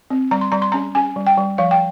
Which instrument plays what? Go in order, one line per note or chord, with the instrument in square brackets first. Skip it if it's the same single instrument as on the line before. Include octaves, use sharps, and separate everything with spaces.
[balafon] C4
G3 A#5
C6
G3 A#5
C6
C#4 A#5
C#4 G#5
G3
G5
G3
F3 F5
G5